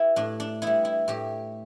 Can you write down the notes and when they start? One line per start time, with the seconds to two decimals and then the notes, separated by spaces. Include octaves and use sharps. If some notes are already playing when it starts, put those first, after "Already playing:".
Already playing: B3 E4 G4
0.16 A2 D4
0.40 D4
0.62 G3 B3 E4
0.85 E4
1.08 A2 G4